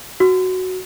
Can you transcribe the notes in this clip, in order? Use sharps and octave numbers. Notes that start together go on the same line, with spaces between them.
F#4